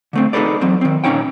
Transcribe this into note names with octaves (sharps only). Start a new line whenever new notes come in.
D3 A3 C4
D#4 G#4 A4 B4 D5
E2 F#3 C4
D#3 C4
A#2 C#4 D#4 C#5 G5